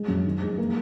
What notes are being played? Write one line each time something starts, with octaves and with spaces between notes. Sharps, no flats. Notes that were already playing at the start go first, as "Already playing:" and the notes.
Already playing: G#3
F#2
D#3
G#3
A#3